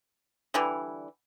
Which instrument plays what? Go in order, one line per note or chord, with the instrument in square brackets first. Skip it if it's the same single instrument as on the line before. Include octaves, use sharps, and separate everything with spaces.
[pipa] D3 E3 G3